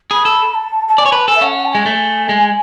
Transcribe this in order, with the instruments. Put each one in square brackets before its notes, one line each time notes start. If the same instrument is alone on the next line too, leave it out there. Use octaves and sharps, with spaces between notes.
[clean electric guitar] G#4 [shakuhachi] B5
[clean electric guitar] A4
[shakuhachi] A5
A5
[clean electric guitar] D5 [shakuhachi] G#5
[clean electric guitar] C#5
[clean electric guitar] B4 [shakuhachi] A5
[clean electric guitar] A4 [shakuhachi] G#5
[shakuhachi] E5
[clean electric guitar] C#4 [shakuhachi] F#5
[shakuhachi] F#5
A5
[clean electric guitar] G#3 [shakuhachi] G#5
[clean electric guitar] A3
G#3